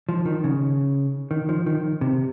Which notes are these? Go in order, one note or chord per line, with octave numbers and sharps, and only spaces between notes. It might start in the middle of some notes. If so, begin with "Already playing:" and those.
F3
D#3
C#3
D#3
F3
D#3
C3